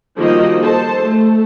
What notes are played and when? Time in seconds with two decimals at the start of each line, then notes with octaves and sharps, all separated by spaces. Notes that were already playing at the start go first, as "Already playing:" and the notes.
0.19 D#3 F3 G3 A#3 F#4 D#5
0.61 A4 C5 A5
1.04 A3